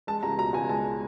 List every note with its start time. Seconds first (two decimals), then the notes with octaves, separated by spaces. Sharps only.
0.07 G#3 A5
0.23 C#2 A#5
0.38 B2 A#5
0.53 C#2 G#5
0.69 G#3 A5